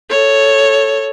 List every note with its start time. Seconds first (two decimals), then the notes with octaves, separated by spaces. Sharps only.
0.10 A4 C#5